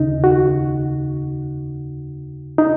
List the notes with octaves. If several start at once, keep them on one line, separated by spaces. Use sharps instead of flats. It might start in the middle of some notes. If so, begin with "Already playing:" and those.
Already playing: D#2 C#3 D#4
F#4
D#4